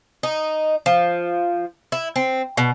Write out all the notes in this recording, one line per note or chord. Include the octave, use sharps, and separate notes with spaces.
D#4
F3
E4
C4
B2